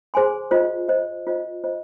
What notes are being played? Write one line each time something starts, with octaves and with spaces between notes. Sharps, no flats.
G#4 C5 G#5 C6
F4 C5 D#5
F4 C5 D#5
F4 C5 D#5
F4 C5 D#5